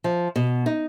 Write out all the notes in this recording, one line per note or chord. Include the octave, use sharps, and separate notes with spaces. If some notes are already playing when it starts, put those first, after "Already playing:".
F3
B2
D#4